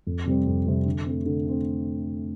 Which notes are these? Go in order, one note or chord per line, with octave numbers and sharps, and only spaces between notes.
F2
C3 G3 C4
F2
C3 G3 C4
D3
A3 C4
D3
A3 C4